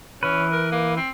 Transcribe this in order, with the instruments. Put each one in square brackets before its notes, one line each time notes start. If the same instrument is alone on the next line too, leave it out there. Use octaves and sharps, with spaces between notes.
[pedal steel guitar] E3 B4 [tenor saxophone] C#4
[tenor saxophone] A#4
A#3
C4